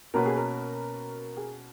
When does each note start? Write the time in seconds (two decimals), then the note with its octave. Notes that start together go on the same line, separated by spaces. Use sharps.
0.14 B2 A#3 C#4 F#4 A#4 B4
0.26 G#4
0.37 A#4
1.37 G#4